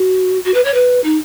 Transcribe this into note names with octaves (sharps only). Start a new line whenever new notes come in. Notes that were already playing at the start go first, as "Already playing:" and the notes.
Already playing: F#4
F#4
B4
C#5
B4
D#4